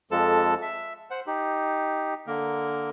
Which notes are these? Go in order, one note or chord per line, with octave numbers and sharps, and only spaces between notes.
F2 F3 G#3 A4 A5
E5
C5 F#5
D#4 G4
D3 A#3 A#4